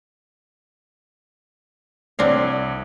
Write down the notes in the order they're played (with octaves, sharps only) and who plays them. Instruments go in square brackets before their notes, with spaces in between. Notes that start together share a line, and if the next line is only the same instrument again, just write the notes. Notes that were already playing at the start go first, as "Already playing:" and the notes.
[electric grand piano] C2 C#5 [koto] C4 D4 F5